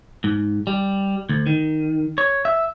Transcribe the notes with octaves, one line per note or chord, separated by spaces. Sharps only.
G#2
G3
D2
D#3
C#5
E5